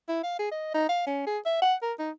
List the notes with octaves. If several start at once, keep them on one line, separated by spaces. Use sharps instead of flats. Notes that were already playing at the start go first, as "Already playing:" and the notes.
E4
F5
G#4
D#5
D#4
F5
C#4
G#4
E5
F#5
A#4
D#4